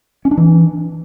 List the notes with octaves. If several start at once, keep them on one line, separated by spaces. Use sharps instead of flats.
C#4
D4
E3